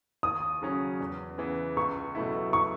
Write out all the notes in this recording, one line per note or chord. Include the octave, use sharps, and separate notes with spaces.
D#2 D#6
C#3 F#3 C#4
E2
C#3 E3 B3
C#2 C#6
B2 F#3 A3 E4
C#6